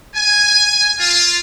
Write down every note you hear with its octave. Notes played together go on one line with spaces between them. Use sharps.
G#5
F4